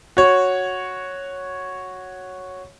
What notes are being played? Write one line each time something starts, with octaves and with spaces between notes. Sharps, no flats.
F#4 C#5